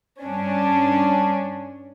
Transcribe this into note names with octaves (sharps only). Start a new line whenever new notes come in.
G2 C#4 D4